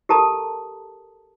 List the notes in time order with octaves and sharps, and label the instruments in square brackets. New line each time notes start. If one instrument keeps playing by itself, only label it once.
[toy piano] G4 A4 A#4 A5 A#5 D#6